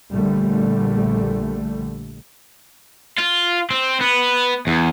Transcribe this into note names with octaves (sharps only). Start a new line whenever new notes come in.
A#1 D3 G3 A3
F4
C4
B3
E2